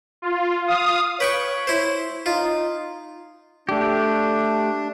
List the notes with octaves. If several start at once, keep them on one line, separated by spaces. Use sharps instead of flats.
F4
F5 D#6
B4 C#5 G5 C#6
E4 C5
D#4 F4
A3 D4 G4